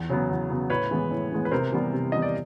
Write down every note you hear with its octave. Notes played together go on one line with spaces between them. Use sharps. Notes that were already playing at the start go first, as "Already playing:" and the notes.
Already playing: E2
C#3 F#3 B3
E2
C#3 F#3 B3
A2 B4 C#5
E3 G#3 B3
A2
E3 G#3 B3
B4
C3 A#4 C5
E3 G3 B3
C3
E3 G3 B3 D#5
D5